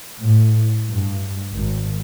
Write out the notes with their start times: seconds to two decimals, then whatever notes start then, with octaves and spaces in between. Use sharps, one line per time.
0.19 A2
0.88 G2
1.53 G#1